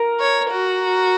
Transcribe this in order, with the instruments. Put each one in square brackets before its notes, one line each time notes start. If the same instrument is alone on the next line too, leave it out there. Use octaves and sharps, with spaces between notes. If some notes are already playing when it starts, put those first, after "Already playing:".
Already playing: [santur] A#4
[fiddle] C#5
F#4